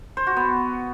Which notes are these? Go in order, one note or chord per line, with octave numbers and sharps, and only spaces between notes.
C5
F#4
B3